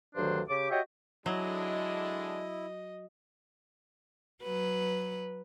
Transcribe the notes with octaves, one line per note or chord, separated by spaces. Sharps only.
D2 G2 D#3 F#3 D4 C5
C#3 G4 D6
F#4 G4 C#5 D#5 E5 G5
D3 F#3 G#3 D4 E4 D#5
F#3 B4